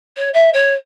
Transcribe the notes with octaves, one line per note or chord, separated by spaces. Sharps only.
C#5
E5
C#5